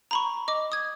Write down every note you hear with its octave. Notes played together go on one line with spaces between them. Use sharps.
A#5 B5 C#6
D#5 D6
D#6 G#6